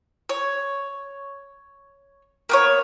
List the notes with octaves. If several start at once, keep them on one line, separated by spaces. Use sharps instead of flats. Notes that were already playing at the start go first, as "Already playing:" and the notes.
C#5
A#3 B3 C#5